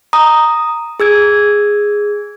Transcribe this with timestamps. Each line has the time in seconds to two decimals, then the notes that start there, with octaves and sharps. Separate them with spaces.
0.13 A#5 D#6
1.00 G#4 E6 G#6 D7